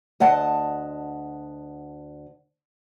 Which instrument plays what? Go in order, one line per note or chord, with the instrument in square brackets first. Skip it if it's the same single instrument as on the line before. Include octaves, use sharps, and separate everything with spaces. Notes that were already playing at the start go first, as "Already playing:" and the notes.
[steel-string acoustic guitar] D2 D#5 F#5 A5